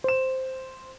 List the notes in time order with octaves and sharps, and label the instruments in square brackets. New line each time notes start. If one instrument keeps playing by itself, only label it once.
[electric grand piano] C5 E7